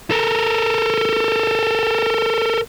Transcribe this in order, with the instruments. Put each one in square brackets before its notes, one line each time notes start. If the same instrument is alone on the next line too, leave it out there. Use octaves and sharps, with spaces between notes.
[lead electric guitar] A4 A#4